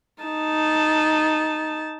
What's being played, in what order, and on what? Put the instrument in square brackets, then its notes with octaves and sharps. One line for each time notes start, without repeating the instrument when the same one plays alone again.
[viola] D#4 A5